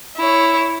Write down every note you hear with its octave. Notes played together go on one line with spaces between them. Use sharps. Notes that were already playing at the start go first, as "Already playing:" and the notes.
E4 C#5